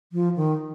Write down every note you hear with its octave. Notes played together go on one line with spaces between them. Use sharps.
F3
D#3